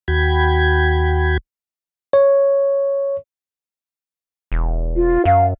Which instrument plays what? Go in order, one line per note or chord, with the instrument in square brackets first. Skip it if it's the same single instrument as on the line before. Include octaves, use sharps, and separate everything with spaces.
[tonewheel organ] D#2 F#4 G5 B5 G#6
[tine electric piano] C#5
[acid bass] E1
[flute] F4
[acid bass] F#2 [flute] F5